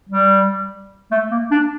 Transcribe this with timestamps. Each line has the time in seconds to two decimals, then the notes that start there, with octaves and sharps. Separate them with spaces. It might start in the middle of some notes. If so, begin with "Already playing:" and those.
0.10 G3
1.11 A3
1.31 A#3
1.51 D4